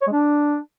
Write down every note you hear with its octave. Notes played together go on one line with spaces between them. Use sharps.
C#5
G#3
D4